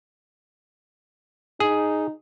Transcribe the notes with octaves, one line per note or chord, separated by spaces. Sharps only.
D#4 G#4